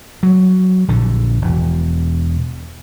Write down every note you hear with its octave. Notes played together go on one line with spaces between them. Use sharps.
F#3
A#1 D3
E1